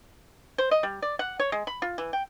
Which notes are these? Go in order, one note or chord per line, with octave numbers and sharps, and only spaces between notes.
C5
D#5
G3
D5
F#5
C#5
G#3
B5
F4
E3
G5